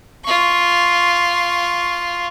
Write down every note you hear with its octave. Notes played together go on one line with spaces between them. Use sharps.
F4 C#6